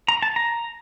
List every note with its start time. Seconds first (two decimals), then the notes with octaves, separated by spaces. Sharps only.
0.08 A#5
0.23 A5
0.36 A#5